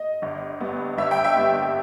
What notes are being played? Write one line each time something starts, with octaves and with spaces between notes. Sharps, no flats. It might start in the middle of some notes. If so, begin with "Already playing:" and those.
Already playing: D#5
G1
G2 G3 B3
G1 E5
G5
E5
G2 G3 B3